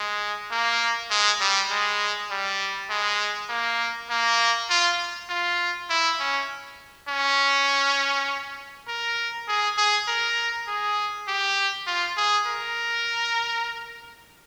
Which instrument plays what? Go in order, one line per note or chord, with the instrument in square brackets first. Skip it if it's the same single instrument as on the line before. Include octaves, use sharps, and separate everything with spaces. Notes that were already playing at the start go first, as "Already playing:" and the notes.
Already playing: [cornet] G#3
A#3
G#3
G3
G#3
G3
G#3
A#3
A#3
F4
F4
E4
C#4
C#4
A#4
G#4
G#4
A#4
G#4
G4
F4
G#4
A#4